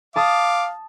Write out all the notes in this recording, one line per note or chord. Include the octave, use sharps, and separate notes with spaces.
F5 A5 D6 D#6